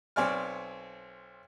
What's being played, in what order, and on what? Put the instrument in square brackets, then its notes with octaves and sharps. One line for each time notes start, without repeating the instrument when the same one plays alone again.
[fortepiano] B1 C4 C#5 D5 G#5 F6